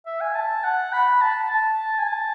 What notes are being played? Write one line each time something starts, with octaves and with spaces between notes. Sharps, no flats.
E5
G#5
A5
F#5
B5
A5
A5
G#5
A5